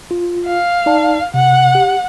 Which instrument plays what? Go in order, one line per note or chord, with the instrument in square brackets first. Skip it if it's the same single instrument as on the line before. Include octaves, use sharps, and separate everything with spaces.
[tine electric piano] F4
[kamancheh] F5
[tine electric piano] D#4 D5 A5
[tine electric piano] C3 [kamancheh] F#5
[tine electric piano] G4